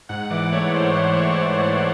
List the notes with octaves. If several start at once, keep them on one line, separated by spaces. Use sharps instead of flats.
G#2 F#5
E3 D5
A3 C#5
G#2 C5
G#2 C5
G#2 C#5
C5
G#2 C#5
E3 C5